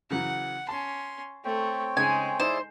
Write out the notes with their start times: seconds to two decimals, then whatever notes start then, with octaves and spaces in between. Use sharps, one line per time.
0.11 C#3 E3 F#3 F#5
0.69 C#4 A5 C6
1.45 A3 C4 C#5 G5
1.97 C#3 G#3 D#4 G#4 G#5
2.40 D#4 E4 G#4 C5 D5